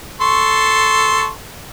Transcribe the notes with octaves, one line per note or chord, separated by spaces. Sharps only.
A4 C6 C#6